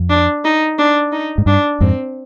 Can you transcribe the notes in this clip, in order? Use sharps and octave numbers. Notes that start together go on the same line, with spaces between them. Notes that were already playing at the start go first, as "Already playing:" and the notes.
Already playing: F2
D4
D#4
D4
D#4
G#2
G2 D4
F2 G#2 C4